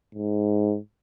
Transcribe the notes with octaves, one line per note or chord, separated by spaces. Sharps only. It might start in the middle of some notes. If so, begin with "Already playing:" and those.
G#2